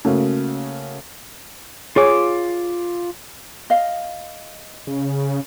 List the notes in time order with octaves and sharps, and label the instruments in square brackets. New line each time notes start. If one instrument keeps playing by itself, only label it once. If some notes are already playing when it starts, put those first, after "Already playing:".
[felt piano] C#3 A3 A#3 F#4
[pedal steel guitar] F4 D6 [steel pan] G#4 C#5 G#5
[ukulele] D#5 F5
[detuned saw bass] C#3